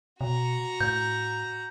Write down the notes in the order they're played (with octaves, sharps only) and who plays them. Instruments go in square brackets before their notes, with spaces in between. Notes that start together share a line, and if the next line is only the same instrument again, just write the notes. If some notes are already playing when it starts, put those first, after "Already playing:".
[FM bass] B2 [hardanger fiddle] F#4 A#5
[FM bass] A2 [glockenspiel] G6